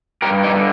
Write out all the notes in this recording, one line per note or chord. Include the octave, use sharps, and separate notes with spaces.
G2 G4 A#4
D#4 G4
D3